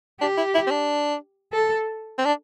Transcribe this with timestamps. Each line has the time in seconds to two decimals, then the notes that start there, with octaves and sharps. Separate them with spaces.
0.21 D4 G4
0.37 E4
0.54 E4
0.67 C4
0.70 D4
1.53 A4
2.18 C4
2.25 D4